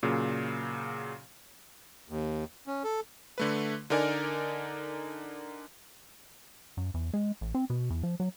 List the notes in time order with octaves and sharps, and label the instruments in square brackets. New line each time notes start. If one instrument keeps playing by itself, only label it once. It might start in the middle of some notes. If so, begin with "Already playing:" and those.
[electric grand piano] A#2 C#3 F#3
[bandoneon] D#2
C#4
A4
[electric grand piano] D3 A3 B4
D3 D#4 A#4 D5 G#5
[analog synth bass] F#2
E2
G#3
A1
C4
B2
E2
F3
F#3